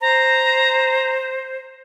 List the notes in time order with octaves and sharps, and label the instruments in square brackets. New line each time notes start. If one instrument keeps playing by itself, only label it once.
[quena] C5 [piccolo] A#5